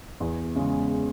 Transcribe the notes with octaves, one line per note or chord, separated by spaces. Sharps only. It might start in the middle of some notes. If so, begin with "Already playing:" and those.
E2
C#3 G#3